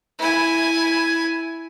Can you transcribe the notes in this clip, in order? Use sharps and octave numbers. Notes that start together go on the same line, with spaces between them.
E4 G#5